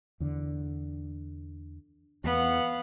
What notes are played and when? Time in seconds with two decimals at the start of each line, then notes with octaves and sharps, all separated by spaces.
0.20 E2 D3
2.24 E2 B3 F5 F#5